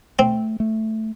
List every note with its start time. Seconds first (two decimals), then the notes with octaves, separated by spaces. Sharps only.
0.19 A3 C4
0.60 A3